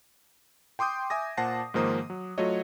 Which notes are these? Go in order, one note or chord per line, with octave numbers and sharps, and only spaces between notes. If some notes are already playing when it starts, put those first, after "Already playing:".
G5 C6 D6 D#6 G6
E5 G#5 D#6 A#6
A#2 C5 F#5 A5 A#6 C7
G#2 D#3 F3 A#3 C5 D#6
F#3
F#3 A3 F4 F#4 C#5 D#5